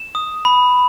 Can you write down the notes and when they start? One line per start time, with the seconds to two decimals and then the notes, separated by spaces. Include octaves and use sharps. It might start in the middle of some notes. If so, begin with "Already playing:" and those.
Already playing: E7
0.15 D#6
0.45 B5